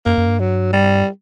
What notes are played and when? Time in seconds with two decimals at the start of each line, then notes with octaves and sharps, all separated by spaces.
0.06 F#2 A#3
0.18 F#2
0.28 G2
0.40 F#3
0.73 G3